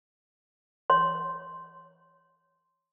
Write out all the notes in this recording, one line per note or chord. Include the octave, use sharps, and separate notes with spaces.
C#5 C6